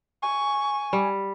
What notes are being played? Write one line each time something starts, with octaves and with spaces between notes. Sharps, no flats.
G#5 C#6
G3